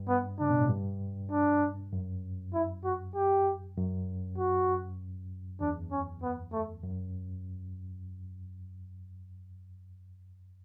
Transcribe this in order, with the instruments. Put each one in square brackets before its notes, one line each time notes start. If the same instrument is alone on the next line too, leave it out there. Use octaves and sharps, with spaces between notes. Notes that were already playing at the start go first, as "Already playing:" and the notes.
Already playing: [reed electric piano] G2
[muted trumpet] B3
[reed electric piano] C#3 [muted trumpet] D4
[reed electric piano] B2
A2
G2
[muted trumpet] D4
[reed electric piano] F#2
[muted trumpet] E4
F#4
G4
[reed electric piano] F#2
[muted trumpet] F#4
[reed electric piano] E2 [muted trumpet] D4
[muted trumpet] C#4
B3
A3
[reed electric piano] F#2